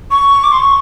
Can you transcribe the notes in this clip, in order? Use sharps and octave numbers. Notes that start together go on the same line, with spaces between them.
C#6
D6
C6
C#6